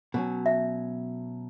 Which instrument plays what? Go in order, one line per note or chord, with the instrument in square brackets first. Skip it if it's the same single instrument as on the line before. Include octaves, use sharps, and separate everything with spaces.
[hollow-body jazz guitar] B2 F#3 C#4
[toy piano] E5